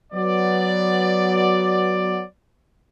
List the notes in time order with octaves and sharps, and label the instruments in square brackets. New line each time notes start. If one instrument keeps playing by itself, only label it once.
[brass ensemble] F#3 B3 D5